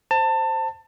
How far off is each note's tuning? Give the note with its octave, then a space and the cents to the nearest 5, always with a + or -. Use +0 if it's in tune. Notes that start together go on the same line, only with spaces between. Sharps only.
C5 +0 A5 +25